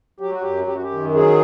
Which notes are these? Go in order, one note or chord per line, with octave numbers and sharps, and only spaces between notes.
F#3 G4
F#4
F#2 G4
F#2 G4
F#4
G4
D#3
F#3 G#4